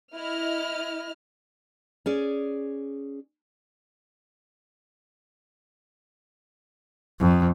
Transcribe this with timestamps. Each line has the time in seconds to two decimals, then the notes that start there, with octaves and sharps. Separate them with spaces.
0.14 E4 D#5 F6
2.06 C#4 G#4 D5
7.20 F2